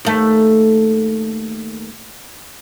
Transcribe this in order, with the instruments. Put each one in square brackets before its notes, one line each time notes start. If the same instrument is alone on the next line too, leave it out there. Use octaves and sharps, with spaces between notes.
[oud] D#2 A3